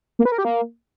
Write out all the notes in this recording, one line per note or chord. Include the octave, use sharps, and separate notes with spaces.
A#3
B4
A#4
G4
A#3